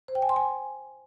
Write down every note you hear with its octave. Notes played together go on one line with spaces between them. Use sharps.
C5
G5
G#5
C6
G#5